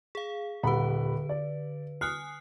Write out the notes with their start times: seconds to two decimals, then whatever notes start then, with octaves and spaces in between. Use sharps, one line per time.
0.15 G#4 F5
0.63 D#1 D3 B4 F#5 B5
1.29 D5
2.01 G#5 D#6 F6 F#6 C7